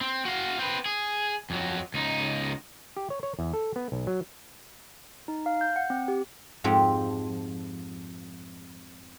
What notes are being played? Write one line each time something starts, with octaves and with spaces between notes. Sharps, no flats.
C4
F#4 F5
C4 B4
G#4
F2 F#3
C#2 D#4
G4
C#5
C#5
E2
A4
B3
B1
F#3
D#4
F5
G6
F#5
C4
G4
F2 G#2 F3 C4 G4